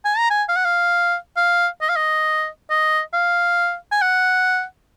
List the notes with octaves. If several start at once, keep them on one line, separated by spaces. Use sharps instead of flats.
G#5
A#5
G#5
F5
F#5
F5
F5
D#5
F5
D#5
D#5
F5
G#5
F#5